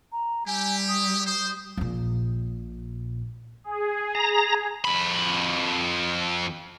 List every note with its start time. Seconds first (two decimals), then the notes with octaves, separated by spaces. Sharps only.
0.12 A#5
0.47 G3 E4 G4 G#5
0.89 D#6
1.26 C5 D#6
1.77 A#1 A#2
3.64 G#4
4.15 A#5
4.85 F2 B5